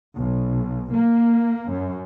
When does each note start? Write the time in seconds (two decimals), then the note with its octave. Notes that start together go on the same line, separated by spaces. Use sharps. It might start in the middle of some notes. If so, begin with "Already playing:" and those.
0.19 B1
0.92 A#3
1.70 F#2